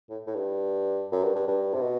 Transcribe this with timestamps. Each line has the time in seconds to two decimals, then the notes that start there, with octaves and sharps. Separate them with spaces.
0.09 A2
0.27 A2
0.35 G2
1.12 F#2
1.23 G2
1.35 G2
1.48 G2
1.74 C3
1.81 B2